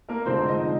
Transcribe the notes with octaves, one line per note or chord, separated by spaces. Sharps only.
A#3 A#4
F1 F2 D3 F3 G#3 C4 C5
D#4 D#5